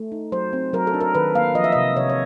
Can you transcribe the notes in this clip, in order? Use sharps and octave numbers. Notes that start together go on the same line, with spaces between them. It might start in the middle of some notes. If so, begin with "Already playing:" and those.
Already playing: A3
D#4
F#3 C5
C4
F#3 A#4
A4
D4
A#4
D#3 B4
A#3 F5
F3 D#5
E5
C3 D#5
C3 C#5
C#5